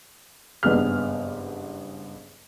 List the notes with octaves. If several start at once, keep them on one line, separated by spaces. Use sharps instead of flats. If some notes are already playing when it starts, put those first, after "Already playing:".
F#1 G2 B3 G#4 F6